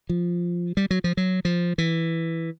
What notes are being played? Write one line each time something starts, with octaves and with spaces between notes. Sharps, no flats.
F3
G3
F#3
F3
F#3
F3
E3